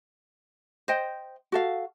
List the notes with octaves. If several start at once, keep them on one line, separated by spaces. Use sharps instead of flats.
C5 D#5 G5
F#4 A4 F5